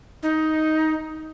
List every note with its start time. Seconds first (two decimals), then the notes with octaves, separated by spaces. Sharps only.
0.23 D#4